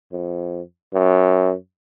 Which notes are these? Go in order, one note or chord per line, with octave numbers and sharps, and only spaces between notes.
F2
F#2